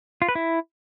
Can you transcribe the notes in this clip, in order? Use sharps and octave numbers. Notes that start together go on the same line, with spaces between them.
F4
B4
E4